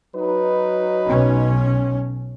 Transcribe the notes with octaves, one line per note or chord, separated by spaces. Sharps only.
F#3 D#4 B4
B1 C#4